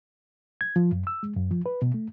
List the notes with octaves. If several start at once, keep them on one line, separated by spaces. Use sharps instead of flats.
G#6
F3
F#2
E6
G#3
F#2
F3
B4
B2
A3